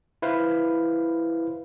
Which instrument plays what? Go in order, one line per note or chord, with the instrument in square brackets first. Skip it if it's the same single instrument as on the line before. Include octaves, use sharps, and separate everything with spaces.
[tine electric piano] E4 B4 C5 F5